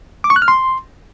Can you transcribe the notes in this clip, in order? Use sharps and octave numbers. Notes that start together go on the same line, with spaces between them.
D6
C#6
F#6
F6
C6